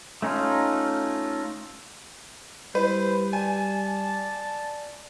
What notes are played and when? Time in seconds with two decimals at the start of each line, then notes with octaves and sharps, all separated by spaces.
0.22 A3 C#4 D#4 F4
2.75 G3 E4 B4 C5
3.33 D5 G#5 A5